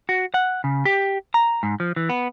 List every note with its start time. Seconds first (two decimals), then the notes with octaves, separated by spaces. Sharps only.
0.09 F#4
0.34 F#5
0.64 C#3
0.85 G4
1.34 A#5
1.63 G#2
1.80 F3
1.96 E3
2.09 B3